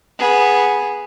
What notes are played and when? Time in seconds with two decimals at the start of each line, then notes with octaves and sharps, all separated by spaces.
0.19 B3 G#4